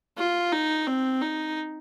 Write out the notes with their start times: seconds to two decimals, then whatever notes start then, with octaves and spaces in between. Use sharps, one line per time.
0.17 F4
0.52 D#4
0.87 C4
1.22 D#4